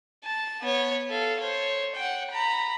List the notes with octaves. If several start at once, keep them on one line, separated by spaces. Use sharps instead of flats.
A5
B3 C#5
A4 F5
C5 C#5
F#5 G5
A#5 B5